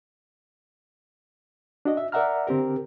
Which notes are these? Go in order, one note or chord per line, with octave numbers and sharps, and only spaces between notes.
D4 F#4 D#5
E5
A#4 D5 E5 F#5 A#5 F6
D3 C4 G4 A#4